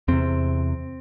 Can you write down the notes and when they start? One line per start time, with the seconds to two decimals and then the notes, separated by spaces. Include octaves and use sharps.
0.08 E2 C3 C4